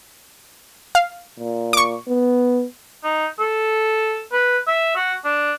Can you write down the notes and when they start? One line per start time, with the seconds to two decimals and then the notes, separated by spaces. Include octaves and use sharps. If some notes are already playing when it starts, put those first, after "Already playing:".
0.95 F5
1.39 A#2
1.73 C#6 D6
2.08 B3
3.04 D#4
3.39 A4
4.32 B4
4.67 E5
4.96 F#4
5.24 D4